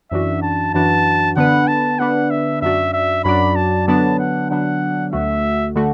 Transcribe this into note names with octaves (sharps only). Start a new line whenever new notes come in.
F#2 E3 D4 F#4 E5
A5
F#2 E3 D4 F#4 A5
D3 B3 D4 B4 F#5
A5
D3 B3 D4 B4 F#5
E5
F#2 F#3 D4 F#4 D5 E5
E5
F#2 F#3 D4 F#4 D5 B5
A5
D3 F#3 B3 D4 A5
F#5
D3 F#3 B3 D4 F#5
D2 D3 A3 F#4 E5
D3 A3 F#4